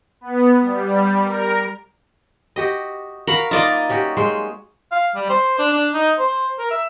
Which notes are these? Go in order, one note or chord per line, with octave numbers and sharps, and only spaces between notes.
B3
G3
A#4
F#4 G4 D#5
F#4 A#4 F5 B5
A#3 D#4 F4 D5 D#5
C#4 F#4 G4
G#3 C#4 C5
F5
G3
C5
D4
D4
D#4
C5
A#4
E5